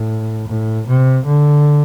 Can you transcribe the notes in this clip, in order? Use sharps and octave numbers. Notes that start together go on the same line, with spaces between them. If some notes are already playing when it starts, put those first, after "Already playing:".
Already playing: A2
A2
C3
D3